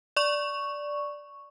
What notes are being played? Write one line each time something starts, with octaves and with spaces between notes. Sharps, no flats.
D5 C#6